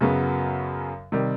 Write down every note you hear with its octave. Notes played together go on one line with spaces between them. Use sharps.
F#2 C#3 F#3 B3
C3 D#3 G3